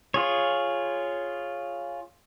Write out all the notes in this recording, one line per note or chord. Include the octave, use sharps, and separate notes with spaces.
F4 G#4 C#5